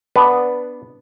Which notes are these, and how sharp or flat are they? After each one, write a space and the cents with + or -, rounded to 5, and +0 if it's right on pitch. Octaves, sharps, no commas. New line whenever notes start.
B3 +0 D4 +0 B4 +0